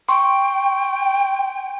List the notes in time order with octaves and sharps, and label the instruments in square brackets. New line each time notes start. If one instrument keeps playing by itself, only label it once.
[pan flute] G5 [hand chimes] C6 C#6